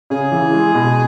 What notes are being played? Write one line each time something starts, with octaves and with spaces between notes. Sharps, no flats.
C#3 G#4
E3
G#3
B2